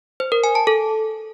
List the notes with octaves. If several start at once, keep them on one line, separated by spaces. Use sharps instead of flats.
C5
A#4
G#5
A5
A4